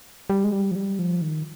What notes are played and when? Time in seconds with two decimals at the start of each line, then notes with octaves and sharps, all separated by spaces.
0.30 G3
0.44 G#3
0.53 G3
0.71 F3
0.76 G3
0.99 F3
1.22 D#3